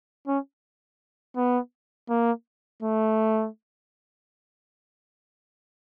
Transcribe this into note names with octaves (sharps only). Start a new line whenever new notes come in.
C#4
B3
A#3
A3